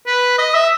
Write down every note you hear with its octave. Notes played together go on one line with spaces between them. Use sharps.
B4
D#5
E5